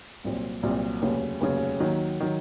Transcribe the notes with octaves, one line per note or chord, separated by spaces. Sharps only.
C2 A#2 F#3 C4
C2 A#2 F#3 C4
F1 D#2 C#3 F#3
F1 D#2 C#3 F#3
D#2 D#3 F#3
D#3 F#3